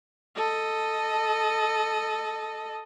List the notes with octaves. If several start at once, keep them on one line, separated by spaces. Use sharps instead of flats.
A4 D#5